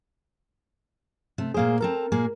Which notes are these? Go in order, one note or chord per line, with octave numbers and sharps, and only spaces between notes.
C3 A3
A#2 A#3 G#4 C5 F5
C4 A4 A#4 A#5
A#2 A#3 G#4